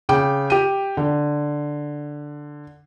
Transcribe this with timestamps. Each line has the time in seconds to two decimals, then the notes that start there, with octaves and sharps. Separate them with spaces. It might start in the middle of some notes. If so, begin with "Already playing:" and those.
0.09 C#3 G5 D6
0.50 G4 D#7
0.97 D3